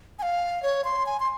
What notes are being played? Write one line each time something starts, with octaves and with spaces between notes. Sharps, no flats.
G#5
F5
C#5
C6
G#5
C6